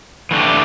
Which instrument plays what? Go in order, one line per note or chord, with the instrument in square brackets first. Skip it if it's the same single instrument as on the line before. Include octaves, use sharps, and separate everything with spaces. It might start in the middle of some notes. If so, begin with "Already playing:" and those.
[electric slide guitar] E3 A3 D4 G4